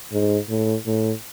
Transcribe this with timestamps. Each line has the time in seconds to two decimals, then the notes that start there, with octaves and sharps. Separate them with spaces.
0.12 G#2
0.49 A2
0.86 A2